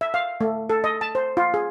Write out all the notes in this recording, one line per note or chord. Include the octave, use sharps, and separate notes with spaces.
E5
F5
A3
A4
D#5
A5
C5
F4
G#4